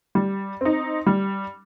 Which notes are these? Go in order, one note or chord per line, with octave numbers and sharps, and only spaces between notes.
G3
C4 D#4
G3